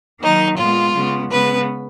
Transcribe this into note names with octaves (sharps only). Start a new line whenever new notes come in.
D#3 F#3 A#3 D#4
A#2 G#3 B3 F4
C#3 G#3 B3
C#3 G#3 B3 B4